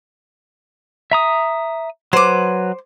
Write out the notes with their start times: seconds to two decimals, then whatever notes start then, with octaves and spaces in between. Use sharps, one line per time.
1.12 E5 A#5 D#6
2.13 F#3 B4 C5 D6